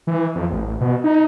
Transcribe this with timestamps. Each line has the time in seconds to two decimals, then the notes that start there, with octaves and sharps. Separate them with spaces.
0.07 E3
0.35 F2
0.50 A1
0.81 B2
1.04 D#4